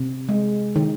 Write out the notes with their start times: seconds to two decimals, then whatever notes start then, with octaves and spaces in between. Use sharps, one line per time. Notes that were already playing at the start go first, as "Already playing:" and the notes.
Already playing: C3
0.29 G#3
0.76 D#3